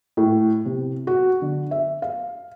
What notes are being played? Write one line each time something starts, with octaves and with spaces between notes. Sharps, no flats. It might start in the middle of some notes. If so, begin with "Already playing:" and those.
A2
C3
F#4
D3
E5
F5